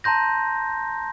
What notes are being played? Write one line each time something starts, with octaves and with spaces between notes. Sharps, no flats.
A5 A#5 C6 G6 A#6